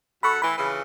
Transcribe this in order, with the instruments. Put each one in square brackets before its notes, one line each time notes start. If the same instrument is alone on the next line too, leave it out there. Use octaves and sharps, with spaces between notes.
[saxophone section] F#2 A4 F#5 [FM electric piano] B5 C#6
[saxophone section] A2 E3 [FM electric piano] B5
[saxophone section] F2 C#3 E3